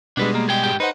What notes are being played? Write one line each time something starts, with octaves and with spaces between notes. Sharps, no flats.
B2 G3 G#3 D4 B4
A#3
G#4 G5
G#2 G4 G5
D#4 B4 C5 F#5